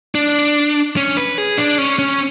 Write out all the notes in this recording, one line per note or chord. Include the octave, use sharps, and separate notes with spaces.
D4
C#4
B4
G#4
D4
C#4
C#4